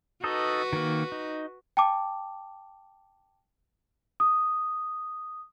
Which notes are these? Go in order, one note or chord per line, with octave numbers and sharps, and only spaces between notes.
D#4 F#4 A4 B4 D#5
D#3 A#3
D#4
G5 A5 D6
D#6